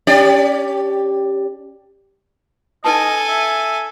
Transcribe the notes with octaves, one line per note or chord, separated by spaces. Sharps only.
C#4 G4 D5
D#4 A4 B4 D#5 G#5 A5
E5